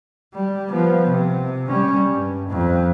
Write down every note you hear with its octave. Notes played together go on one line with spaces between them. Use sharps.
G3
F3 B3
C3
G3 C#4
G2
F2